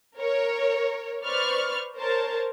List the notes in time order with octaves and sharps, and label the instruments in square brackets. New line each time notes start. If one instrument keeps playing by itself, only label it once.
[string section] A#4 C#5
B4 C5 D5 C#6 F6
A#4 C5 C#5 A5